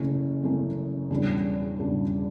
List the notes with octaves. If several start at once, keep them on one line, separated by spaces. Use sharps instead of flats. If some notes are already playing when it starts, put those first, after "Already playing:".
Already playing: F#1 F#2 E3 A3 C#4
F#1 F#2 E3 A3 C#4
E1 E2 C#3 G3 D4
E1 E2 C#3 G3 D4